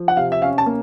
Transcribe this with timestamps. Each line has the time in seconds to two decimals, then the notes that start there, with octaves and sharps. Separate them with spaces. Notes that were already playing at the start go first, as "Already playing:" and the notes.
Already playing: F3
0.08 F#5
0.17 C3 F5
0.32 E5
0.42 C#4 F5
0.58 A5
0.66 A#3